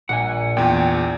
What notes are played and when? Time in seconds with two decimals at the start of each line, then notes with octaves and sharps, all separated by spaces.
0.09 A#1 F#5 G#5
0.57 E2 A#2 G5